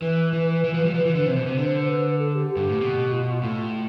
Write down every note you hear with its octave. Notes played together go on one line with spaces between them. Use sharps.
E3 B4
E3
E3
F3
G3
F3
E3
D3
C3 C5
B2
C3
D3
B4
A4
G4
G4
G2
A2
B2
F4
A2